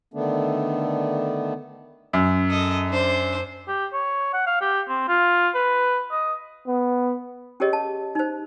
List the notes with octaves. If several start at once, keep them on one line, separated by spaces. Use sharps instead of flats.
D3 D#3 A3 B3 D4
F#2
A4 D#5
D4 C5
G4
C#5
F#5
F5
G4
C4
F4
B4
D#5
B3
C#4 G4 G#4 A#4 C#5 D#5
A5
D#4 C5